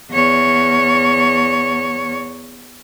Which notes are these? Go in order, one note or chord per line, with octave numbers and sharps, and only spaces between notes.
E2 C#5